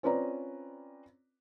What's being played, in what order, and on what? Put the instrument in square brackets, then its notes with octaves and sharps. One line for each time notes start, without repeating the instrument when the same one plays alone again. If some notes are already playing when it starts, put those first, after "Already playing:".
[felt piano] C4 C#4 F4 B4 D5 A#5